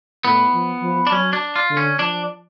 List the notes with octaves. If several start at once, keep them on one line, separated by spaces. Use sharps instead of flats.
A2 B3
F3
F3
D4
F#3 C#4
D4
F4
D3
C#4
F3 D4